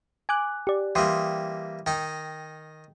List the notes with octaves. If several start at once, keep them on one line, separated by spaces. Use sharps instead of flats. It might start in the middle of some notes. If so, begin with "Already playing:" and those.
G#5 D6 F#6
G4 D5
E3 G3 A#3 G5 C6 D#6
D#3 D#4 G5